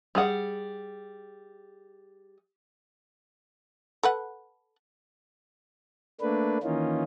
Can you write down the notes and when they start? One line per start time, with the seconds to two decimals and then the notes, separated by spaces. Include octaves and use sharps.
0.15 G3 G#4 F#5
4.03 A4 B4 F#5
6.21 A3 A#3 D4 B4
6.63 D#3 E3 A#3 C#4 D#4 F4